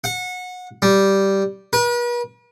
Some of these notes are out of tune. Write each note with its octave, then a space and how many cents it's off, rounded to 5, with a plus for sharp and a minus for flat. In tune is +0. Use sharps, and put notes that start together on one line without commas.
F#5 -25
G3 -5
B4 -45